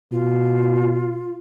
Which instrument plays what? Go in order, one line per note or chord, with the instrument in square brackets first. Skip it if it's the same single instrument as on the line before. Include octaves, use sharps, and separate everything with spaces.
[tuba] B2 [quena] F4